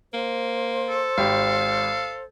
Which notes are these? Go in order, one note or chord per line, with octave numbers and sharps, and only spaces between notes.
A#3 C5
A4
G#1 G4 F5